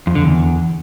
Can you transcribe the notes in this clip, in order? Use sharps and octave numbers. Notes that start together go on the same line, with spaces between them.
F2
D3
E2